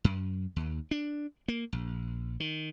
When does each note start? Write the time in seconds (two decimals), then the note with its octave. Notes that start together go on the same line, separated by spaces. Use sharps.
0.04 F#2
0.56 D#2
0.91 D4
1.48 A#3
1.72 A#1
2.40 D#3